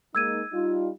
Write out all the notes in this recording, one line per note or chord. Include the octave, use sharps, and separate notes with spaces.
G#3 A#3 D#4 E6 G#6 D#7
G3 D#4 F4